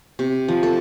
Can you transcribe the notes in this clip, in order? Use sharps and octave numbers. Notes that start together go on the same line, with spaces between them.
C3
F3
A4